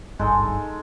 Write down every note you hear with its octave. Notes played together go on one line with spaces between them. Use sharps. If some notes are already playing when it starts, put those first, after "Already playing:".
D1 G#1 G2 G#3 D#4 A4